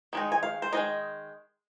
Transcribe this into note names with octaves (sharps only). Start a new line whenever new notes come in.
D#3 G#3 D#4
G#5
F5
C5
D#3 G#3 D#4 D#5